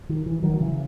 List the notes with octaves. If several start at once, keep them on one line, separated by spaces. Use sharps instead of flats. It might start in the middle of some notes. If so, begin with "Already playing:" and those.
D#3
E3
D#3 F#3
C#3 E3